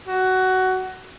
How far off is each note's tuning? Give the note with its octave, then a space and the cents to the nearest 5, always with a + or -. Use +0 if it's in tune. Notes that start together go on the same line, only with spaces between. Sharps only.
F#4 +15